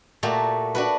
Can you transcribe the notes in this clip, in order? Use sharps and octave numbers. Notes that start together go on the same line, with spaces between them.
A#2 A3 F#4 G4 A#5
D4 F#4 B4